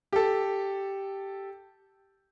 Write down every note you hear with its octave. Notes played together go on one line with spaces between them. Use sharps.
G4 A4